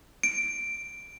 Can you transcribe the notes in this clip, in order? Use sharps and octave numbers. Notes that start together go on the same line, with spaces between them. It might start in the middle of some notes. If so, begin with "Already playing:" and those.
D7